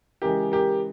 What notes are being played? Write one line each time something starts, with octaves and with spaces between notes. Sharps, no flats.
C#3 E3 G#3 G4 A#4
G4 A#4